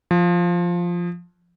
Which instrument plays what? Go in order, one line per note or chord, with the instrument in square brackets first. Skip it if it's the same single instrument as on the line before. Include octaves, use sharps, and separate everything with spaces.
[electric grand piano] F3